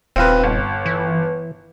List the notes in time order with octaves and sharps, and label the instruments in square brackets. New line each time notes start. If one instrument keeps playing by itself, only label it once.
[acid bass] D#1 [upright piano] C4 F4 B4
[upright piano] G1
[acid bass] E3